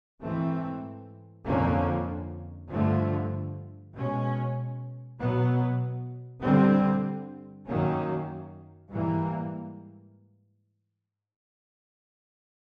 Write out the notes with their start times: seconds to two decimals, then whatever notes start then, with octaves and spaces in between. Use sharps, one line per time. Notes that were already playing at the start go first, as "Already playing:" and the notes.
0.22 G#2 E3 A3 C4
1.46 F2 D3 F3 A#3 C#4
2.70 G2 D3 F3 A3
3.94 B2 G#3 C#4
5.18 B2 F#3 B3
6.43 G2 D3 G3 C4
7.67 F#2 D#3 F#3 A#3 C#4
8.91 G#2 E3 G3 A#3